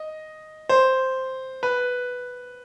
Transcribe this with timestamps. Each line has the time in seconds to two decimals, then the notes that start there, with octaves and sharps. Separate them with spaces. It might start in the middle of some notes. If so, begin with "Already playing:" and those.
Already playing: D#5
0.69 C5
1.63 B4